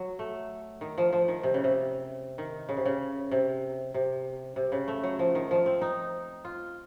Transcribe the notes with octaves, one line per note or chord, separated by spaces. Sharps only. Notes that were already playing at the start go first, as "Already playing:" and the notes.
Already playing: F#3
A3
D#3
F3
F3
D#3
C3
C#3
C3
D#3
C#3
C3
C#3
C3
C3
C3
C#3
A3
F#3
F3
D#3
F3
C4
D#4
F4